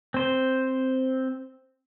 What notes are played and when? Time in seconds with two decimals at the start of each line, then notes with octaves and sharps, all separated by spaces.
0.14 C4 C5